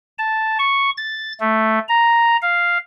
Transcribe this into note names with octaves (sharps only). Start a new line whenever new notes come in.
A5
C#6
A6
A3
A#5
F5